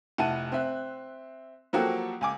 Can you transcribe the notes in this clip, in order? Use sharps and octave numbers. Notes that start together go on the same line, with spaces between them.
F1 E4 F#5 A5 D#7
C4 E5 F#6
F3 F#3 A#3 F#4 G4 A4
C#2 G#5 D6